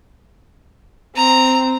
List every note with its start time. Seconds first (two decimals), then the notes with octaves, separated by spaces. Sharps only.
1.16 C4 A#5